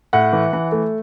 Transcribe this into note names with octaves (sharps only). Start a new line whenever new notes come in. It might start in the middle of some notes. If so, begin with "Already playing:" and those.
A2 F#5
E3
E3
A3